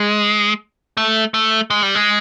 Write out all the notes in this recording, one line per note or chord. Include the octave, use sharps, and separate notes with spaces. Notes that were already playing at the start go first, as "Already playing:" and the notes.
Already playing: G#3
A3
A3
G#3
G3
G#3